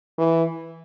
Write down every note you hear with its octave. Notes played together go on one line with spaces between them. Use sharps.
E3